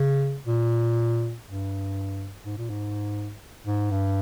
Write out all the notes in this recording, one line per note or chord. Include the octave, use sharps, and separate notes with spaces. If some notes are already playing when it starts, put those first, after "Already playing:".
Already playing: C#3
A#2
G2
G#2
A#2
G#2
G#2
G2